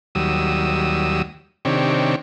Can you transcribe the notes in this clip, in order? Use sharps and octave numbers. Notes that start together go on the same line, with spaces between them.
D#2 F#3 G3 D#6 E6
C3 D#3 C4 D4 G4 C#5